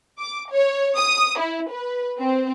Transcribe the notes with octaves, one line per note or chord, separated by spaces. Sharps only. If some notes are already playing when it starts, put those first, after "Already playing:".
D6
C#5
D#6
E4
B4
C4